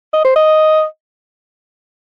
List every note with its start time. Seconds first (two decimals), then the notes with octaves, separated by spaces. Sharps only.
0.13 D#5
0.24 C5
0.36 D#5